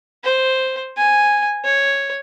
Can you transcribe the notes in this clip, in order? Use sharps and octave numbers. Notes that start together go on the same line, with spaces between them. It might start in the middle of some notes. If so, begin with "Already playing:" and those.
C5
G#5
C#5